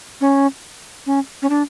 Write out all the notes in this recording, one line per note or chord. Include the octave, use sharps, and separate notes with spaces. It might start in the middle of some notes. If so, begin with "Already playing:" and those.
C#4
C#4
C#4
D4